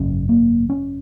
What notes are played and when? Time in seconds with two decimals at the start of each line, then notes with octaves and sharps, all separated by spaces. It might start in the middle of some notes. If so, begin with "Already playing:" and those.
Already playing: G#1 F#2 C#3 C#4
0.29 A#3
0.70 C#4